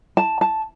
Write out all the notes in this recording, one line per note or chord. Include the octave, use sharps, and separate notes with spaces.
A5
A5